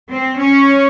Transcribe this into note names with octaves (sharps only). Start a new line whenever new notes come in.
C4
C#4